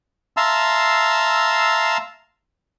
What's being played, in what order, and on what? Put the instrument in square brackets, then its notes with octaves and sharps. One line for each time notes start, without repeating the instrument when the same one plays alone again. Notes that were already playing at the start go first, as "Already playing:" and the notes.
[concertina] E5 F5 A5 A#5 C6 E6